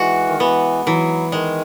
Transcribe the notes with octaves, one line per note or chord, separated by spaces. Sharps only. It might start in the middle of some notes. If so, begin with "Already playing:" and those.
Already playing: E3 G#3 F#4
D#3
E3 B3
E3 F#3
D#3 G#3